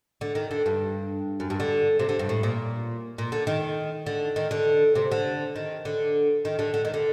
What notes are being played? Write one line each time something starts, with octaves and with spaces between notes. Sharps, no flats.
D3
D#3
D3
G2
F#2
G2
D3
C3
D3
G2
A2
A#2
A#2
D3
D#3
D3
D#3
D3
C3
D3
D#3
D3
D#3
D3
D3
D#3
D3